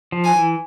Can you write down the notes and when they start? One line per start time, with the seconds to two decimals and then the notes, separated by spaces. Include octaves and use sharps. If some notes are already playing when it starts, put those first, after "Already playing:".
0.12 F3
0.24 G#5
0.36 E3